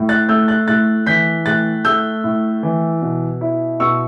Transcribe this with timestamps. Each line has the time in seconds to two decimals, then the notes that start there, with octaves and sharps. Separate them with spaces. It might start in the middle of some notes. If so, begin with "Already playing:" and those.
Already playing: A2
0.09 F#6 A6
0.28 A3 E6 G6
0.48 F#6 A6
0.68 A2 F#6 A6
1.06 E3 G6 B6
1.46 A2 F#6 A6
1.85 A3 E6 G6
2.24 A2
2.63 E3
3.02 B2
3.41 E4
3.80 B2 C#6 E6